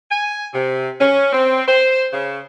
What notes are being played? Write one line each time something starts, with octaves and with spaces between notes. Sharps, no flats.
G#5
C3
C#4
C4
C5
C#3